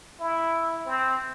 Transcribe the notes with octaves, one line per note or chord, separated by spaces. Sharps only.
E4
C4